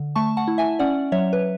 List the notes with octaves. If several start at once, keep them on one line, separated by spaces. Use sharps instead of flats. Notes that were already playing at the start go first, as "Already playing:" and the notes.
Already playing: D3
A3 A5 C#6
F#5 A5
E4
E5 G#5
C#4 D5 F#5
F#3 C#5 E5
B4